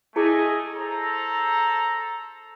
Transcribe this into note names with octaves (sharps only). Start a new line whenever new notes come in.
A3 E4 G#4 D#5 G#5
A4 C5 A#5